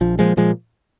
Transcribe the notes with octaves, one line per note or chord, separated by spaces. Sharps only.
A#1 F3
A#2 F3 G#3
A#2 F3 G#3